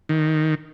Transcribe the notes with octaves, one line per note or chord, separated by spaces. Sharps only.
D#3